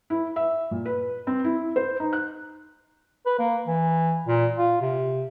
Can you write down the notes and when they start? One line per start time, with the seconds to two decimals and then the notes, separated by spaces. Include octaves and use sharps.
0.10 E4
0.36 E5
0.71 A#2
0.86 B4
1.27 C4
1.44 E4
1.76 C5
2.00 D#4
2.13 F#6
3.26 B4
3.39 A#3
3.67 E3
4.27 A#2
4.57 F4
4.81 C3